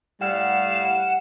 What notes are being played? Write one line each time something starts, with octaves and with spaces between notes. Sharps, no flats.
A2 G3 F5 F#5 E7